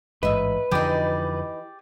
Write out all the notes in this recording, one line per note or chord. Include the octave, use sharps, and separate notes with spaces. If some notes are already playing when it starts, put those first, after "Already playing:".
A1 G#2 B4 D#5 E5
F2 D3 E3 F3 D#4 G4 G#4 D5